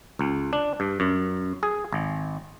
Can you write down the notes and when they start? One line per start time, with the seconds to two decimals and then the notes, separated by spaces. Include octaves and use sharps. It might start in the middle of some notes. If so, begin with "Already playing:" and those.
0.19 C#2
0.53 D4
0.80 G2
1.00 F#2
1.63 G#4
1.93 G#1